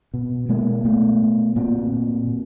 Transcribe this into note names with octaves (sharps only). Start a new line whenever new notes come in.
B2
B2 G#3 A#3
B2 A3 B3
B2
A#2 A#3 C4
A#2
A#2